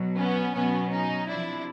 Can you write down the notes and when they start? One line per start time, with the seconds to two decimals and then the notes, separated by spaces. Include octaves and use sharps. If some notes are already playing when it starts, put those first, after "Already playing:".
Already playing: B2 F#3
0.17 B3 C#4
0.54 B2 F#3 B3 C#4
0.91 C#4 D#4
1.28 C3 F3 D4 E4